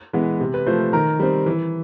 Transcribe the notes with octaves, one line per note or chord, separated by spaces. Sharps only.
E3 G#3 B3
C3
B4
F3 A3 C5
B4
D#3 A#4
G3 C4
E3